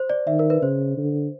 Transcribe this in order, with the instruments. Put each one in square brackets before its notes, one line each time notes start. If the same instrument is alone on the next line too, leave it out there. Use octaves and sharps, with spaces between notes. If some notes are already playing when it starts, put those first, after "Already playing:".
Already playing: [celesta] C5
D5
[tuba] D#3 [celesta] E5
[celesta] A#4
B4
[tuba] C#3 [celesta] C5
[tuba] D3